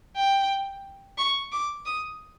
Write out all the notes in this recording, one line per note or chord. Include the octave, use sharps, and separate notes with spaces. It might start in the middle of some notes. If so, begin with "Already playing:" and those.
G5
C#6
D6
D#6